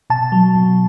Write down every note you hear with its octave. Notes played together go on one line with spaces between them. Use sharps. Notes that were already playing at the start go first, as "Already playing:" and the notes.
B2 A5
F#3
B2